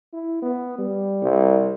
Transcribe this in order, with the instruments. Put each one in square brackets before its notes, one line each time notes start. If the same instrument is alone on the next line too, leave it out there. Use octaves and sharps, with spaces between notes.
[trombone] E4
B3
G3
[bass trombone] C2